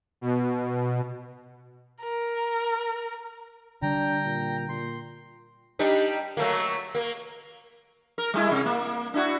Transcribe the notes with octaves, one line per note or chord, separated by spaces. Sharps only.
B2
A#4
D3 G3 D4 G5 A#5
A#2
A#2 C6
G3 D4 D#4
F#3 A3 A#3
A#3
A#4
G3 G#3 E4
C3
A#3
D4 E4 F#4